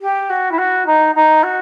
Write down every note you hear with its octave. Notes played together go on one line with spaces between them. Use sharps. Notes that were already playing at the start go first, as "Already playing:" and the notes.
G4
F#4
E4
F#4
D#4
D#4
F#4